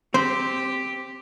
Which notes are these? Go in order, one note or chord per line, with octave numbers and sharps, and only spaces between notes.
C4 G4 C5